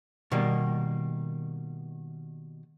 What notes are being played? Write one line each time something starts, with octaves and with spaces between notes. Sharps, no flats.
B2 D#3 G3 A#3